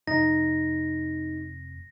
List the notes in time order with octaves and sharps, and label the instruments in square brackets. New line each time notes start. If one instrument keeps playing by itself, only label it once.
[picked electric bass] F1 [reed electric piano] D#4 [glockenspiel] A#6